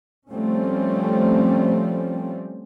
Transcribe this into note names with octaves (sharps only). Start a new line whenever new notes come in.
F3 G3 A3 C4 C#4